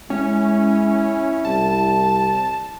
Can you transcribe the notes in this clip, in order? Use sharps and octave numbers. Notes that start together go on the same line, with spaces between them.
G#3 C#4 E4
C2 A5